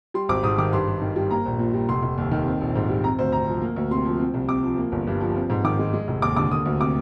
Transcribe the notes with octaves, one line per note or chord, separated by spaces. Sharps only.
G3 C6
G#1 D6
G#2 D#6
D#3 D6
G2 C6
G2
D#3
G3
A#3 A#5
A#1
A#2
G3
F1 C6
F1
D#2
D#3
C4
A#1
G#2
G3
C4 A#5
D2 C5
C3 A#5
F3
A#3
D2
C3 C6
F3
C4
C2
C3 D6
F3
A#3
G1
G2
F3
C4
G#2
D#3 D6
G#3
G#3
F1
D#2 D6
D3 D6
A#3 D#6
D2
C3 D6